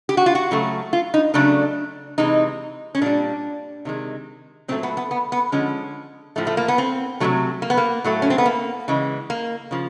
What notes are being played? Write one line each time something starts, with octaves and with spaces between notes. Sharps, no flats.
G4
F#4
F4
F#4
C#3 F#3 A3
F4
D#4
C#3 F#3 A3 D4
C3 E3 G#3 D#4
C#4
A#2 G3 D4
C3 D#3 G#3
A#2 F#3 A3 C4
B3
B3
B3
B3
D3 F3 G#3 C#4
A2 F3 A3
A3
A#3
B3
C4
C3 D#3 F#3 A3
A#3
B3
A#3
A2 F#3 A3
C#4
C4
B3
A#3
C#3 E3 G#3
A#3
C#3 F3